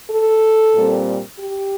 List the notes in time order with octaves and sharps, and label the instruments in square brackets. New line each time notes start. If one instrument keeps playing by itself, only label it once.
[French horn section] A4
A#2 G3 C4
G4